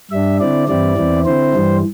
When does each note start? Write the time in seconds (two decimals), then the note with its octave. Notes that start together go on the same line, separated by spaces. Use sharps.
0.11 G2 G3 D4 E5
0.39 D3 C4 E4 D5
0.68 G2 E3 G3 C4 E4 D5
0.97 E2 E3 C4 E4
1.25 D3 C4 E4 C5
1.54 G2 E3 G3